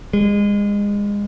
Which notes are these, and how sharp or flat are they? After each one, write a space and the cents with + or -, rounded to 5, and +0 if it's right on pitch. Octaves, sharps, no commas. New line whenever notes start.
G#3 -30